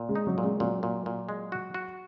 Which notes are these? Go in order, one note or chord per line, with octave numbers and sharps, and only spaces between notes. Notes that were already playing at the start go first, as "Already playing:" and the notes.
Already playing: A#2
G#3
D#4
F#3
A#2
G#3
A#2 F#3
A#2
A#2
G#3
F#4
F#4